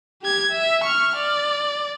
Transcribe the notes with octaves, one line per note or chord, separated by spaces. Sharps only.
G4 G#6
E5
C#6 F6
D5